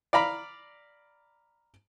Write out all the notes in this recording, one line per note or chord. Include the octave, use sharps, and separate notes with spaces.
D5 F5 A#5 B5